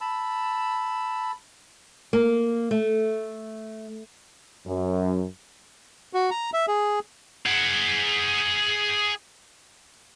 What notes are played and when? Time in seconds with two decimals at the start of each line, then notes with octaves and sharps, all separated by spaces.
0.01 A5 B5 E6
2.13 A#3
2.71 A3
4.66 F#2
6.13 F#4
6.31 A#5
6.53 E5
6.68 G#4
7.46 G#4 F#5